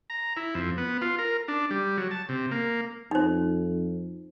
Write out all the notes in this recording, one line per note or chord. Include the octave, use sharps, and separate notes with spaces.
A#5
E4
F2
B3
F4
A#4
D4
G3
F#3
A5
C3
A#3
F2 D#4 C5